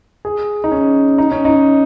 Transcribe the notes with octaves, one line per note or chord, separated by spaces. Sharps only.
G#4
D#4
C#4
D#4
C#4
D#4